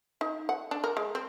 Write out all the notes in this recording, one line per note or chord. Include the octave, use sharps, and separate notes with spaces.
D#4
F#5
D4
A#4
G#3
C4